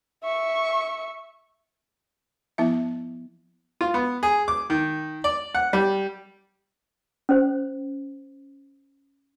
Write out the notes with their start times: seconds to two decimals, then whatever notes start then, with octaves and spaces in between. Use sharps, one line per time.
0.23 E5 C#6
2.58 F3 B3 E4 E5
3.81 F4
3.94 B3
4.23 G#4
4.48 D6
4.70 D#3
5.24 D5
5.55 F#5
5.73 G3
7.29 C#4 C5